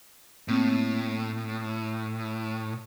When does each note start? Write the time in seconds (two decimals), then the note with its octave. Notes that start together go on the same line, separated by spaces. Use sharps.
0.48 A2 A#3 C4